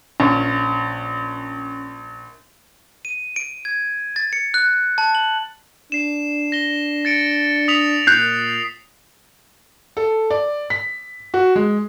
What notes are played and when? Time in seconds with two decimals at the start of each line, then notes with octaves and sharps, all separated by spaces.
0.20 A#1 C#4
3.05 D#7
3.36 D7
3.65 G#6
4.16 A6
4.33 C#7
4.54 F#6
4.98 A5
5.15 F#7
5.92 D4 C7 E7
6.52 A#6 G7
7.05 A6 C#7 D7
7.68 D#6 B6 F7
8.07 A#2 F#6 G6 C7
9.97 A4
10.30 D5
10.70 B6
11.34 F#4
11.55 G#3